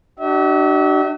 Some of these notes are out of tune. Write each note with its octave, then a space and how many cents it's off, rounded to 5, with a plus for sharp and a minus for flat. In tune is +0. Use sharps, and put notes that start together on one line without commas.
D4 +25 F#4 +40 E5 -35